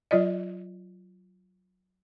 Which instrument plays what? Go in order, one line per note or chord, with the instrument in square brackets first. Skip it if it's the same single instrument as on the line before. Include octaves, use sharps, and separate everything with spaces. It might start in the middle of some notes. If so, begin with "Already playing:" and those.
[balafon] F#3 F4 D5 D#5